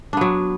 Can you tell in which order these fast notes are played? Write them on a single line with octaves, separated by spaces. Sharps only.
D4 B3 F#3